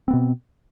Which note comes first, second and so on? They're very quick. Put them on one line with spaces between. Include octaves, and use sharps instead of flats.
C4 B3 B2